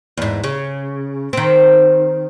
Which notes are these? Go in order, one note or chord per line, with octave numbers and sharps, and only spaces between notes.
E2 G#2
C#3
D#3 C4